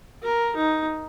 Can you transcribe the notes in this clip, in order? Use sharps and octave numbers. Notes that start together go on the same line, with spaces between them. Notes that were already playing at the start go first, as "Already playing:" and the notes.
A#4
D#4